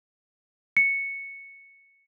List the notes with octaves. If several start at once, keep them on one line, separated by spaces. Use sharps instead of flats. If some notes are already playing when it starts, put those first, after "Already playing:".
C#7